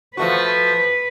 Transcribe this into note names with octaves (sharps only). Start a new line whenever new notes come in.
F3 A3 F#4 B4